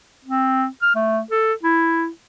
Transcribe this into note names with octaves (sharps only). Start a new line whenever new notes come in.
C4
F6
A3
A4
E4